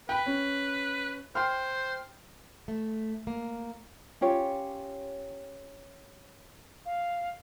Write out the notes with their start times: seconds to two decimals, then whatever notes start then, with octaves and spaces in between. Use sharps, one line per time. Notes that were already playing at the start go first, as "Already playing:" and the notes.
0.09 B4 G5 B5
0.26 C#4
1.35 C5 G5 C6 F6
2.68 A3
3.27 A#3
4.21 C#4 F4 G4 C#5
6.86 F5